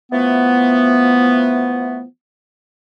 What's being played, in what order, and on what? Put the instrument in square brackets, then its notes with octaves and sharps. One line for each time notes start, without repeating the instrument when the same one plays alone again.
[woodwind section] E3 F3 A3 B3